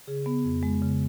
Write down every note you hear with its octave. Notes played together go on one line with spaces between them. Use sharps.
C#3 G#4
B3
F2
G#3
C#3